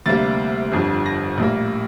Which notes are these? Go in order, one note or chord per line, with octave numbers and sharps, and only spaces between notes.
D2 C3 G3 A#3 A6
G1 F2 D3 G3
A#6
A#1 A2 G3 A#3